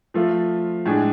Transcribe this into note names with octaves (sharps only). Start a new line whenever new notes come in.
F3 A3 F4
A2 G#3 D4 G#4